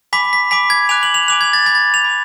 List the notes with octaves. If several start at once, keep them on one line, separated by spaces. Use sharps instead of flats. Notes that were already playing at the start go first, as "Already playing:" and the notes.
G#5 B5 D6 B6
B6
G#5 B5 D6 B6
G#6
G#5 D6 F#6 F7
F#7
F7
G#5 D6 F#6 F7
G#6
A6
G#5 B5 D6 G#6
A6
F7
G#5 B5 D6